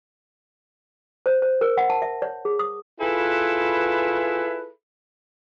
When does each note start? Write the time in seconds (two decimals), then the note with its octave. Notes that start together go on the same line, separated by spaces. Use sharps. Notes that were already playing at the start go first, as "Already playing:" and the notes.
1.26 C5
1.42 C5
1.61 A#4
1.77 F#5
1.90 A5
2.02 E5
2.22 C#5
2.45 G#4
2.59 D#6
3.00 E4 F4 G#4 A4 B4